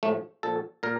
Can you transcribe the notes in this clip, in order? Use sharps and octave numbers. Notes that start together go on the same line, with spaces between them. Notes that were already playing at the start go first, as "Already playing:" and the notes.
A2 F3 A3
A#2 F3 A4
A#2 A#4